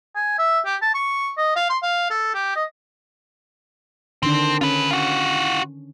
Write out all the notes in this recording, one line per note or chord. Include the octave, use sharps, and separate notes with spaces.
G#5
E5
G4
A5
C#6
D#5
F5
C6
F5
A4
G4
D#5
D3 D#3 C4 D4
C#4 F4 B4
F4 F#4